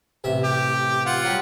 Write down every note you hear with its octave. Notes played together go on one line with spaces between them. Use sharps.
A1 C3 E5
G4
F4 F#5
F#3 G3 G4